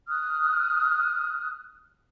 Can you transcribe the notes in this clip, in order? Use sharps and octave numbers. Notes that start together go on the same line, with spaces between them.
D#6 F6 F#6